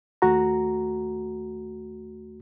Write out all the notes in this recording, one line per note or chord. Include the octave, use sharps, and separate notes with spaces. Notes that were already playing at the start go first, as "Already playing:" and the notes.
D#2 A3 F#4 A#5